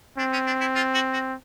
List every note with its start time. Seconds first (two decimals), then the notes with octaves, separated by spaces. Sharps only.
0.18 C4 D4
0.33 C#4
0.47 D4
0.60 E4
0.75 F4
0.94 F#4
1.13 F#4